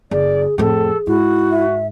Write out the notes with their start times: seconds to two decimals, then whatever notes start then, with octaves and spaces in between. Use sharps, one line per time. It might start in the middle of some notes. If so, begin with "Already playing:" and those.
0.11 F#1 G#4 D5
0.58 F2 A2 G#4 A4
1.07 G#2 E4 F#4
1.51 E5